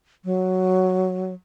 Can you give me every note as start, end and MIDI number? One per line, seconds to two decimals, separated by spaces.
0.25 1.34 54